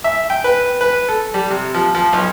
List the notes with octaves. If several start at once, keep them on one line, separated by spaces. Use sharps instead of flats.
E5
G5
B4
B4
A4
G3
C3
F3
F3
B1